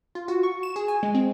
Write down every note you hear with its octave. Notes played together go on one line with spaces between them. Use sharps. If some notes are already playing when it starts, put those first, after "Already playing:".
F4
F#4
C#6
E7
G#4
G#5
G#3
C4